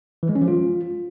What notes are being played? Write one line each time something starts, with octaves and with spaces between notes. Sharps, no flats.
E3
G#3
C#4
F3
F4